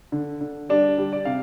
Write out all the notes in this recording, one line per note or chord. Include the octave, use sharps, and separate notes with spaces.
D3
D3
G3 D4 D5
G3
D5
C3 F5